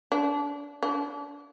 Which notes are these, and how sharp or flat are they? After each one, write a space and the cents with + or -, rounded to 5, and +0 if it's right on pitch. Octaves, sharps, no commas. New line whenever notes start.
D4 -30
D4 -30